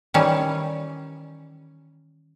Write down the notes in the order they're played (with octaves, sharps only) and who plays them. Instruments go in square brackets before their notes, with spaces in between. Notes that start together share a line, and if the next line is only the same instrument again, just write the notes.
[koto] D#3 E3 G3 C#4